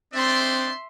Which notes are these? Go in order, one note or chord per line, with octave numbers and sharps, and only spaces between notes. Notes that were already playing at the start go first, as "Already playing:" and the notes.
C4 D4 D#4 D5 E5 C6